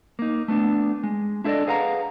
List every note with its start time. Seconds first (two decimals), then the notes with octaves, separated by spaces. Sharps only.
0.19 A#3 D#4
0.48 A3 B3 D4
1.03 G#3
1.44 D4 E4 A4 B4 D5 D#5
1.67 G#4 B4 F5 F#5 A5 A#5